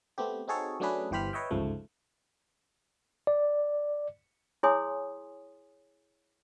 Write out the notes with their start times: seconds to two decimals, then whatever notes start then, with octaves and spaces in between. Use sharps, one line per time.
0.18 A3 B3 C4 G4
0.48 C4 D#4 F#4 G#4 A4 C#5
0.80 F#3 A3 C#4 D4 G#4 B4
1.11 G1 E3 G4 C5 B5 F6
1.33 B4 C#5 D#5 E5 G5
1.51 G1 C#2 G#2 F3 A3
3.27 D5
4.63 E4 G#4 C#5 G#5 C6 D#6